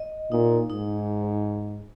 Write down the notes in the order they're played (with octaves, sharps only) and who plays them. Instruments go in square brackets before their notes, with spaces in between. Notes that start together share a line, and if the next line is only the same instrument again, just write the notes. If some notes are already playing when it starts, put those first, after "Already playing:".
Already playing: [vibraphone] D#5
[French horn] A#2 [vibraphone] D#4
[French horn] G#2 [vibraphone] D#4